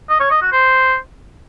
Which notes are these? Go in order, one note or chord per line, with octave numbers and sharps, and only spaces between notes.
D#5
C#5
D#5
F#4
C5